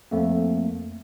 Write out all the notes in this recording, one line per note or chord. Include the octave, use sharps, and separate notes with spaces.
F2 A3 A#3